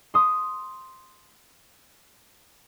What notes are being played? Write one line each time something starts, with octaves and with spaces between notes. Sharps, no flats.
C6 D#6